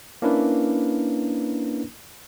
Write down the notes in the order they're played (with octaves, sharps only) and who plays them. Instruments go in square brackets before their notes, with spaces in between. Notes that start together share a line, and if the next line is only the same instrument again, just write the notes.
[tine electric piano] A#3 C#4 D4 E4 A#4 B4